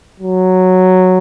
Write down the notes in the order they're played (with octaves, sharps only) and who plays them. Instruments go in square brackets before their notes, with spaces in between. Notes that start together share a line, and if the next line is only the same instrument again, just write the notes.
[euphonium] F#3